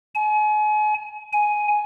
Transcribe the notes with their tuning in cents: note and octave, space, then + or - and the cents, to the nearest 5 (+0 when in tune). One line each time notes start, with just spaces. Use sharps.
G#5 +35
G#5 +10